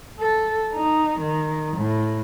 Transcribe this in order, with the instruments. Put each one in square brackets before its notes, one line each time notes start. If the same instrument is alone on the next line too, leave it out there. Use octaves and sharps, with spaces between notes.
[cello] A4
D#4
D#3
A2